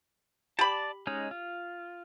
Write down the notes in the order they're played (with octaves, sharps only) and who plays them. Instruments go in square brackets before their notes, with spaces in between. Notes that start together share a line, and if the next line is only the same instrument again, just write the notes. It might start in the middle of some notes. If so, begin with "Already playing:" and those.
[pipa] G4 B5 [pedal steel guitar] D5 A5
[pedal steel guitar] G#3 C#4 D#4
F4